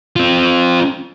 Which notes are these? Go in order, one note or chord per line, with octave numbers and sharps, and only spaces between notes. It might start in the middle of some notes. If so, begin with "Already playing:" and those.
C4 F4